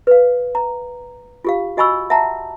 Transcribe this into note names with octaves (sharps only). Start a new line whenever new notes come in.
B4 F5
A#5
F4 G4 F5
F#4 D#5 G#5 B5 C#6 E6
E5 F#5 A5 A#5